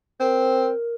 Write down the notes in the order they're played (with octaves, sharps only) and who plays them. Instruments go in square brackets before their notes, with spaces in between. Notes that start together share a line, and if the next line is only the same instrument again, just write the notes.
[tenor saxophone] C4 [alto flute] A#4